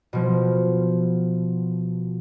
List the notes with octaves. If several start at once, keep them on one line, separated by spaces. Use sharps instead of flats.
B2 F3